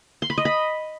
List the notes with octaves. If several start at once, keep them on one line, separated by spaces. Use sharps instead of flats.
C6
B5
D#5
B5